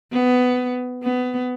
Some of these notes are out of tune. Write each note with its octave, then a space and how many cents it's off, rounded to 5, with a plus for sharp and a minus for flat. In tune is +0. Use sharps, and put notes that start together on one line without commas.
B3 +15
B3 +20